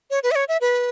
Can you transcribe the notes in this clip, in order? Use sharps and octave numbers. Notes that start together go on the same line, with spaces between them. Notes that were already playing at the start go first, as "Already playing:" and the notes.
C#5
B4
E5
C#5
E5
B4